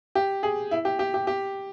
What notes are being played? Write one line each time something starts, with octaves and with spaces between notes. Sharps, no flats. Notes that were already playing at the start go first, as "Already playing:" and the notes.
G4
G#4
E4
G4
G4
G4
G4